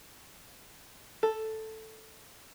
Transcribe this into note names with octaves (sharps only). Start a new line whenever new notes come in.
A4